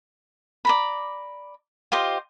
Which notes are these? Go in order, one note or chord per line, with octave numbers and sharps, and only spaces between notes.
D5 A#5 B5
F4 G4 C5 D#5